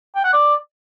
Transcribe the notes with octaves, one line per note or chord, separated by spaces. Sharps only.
G5
F#5
D5